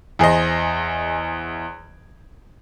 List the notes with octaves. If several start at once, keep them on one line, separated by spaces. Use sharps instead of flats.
E2 G#4 C5 D#5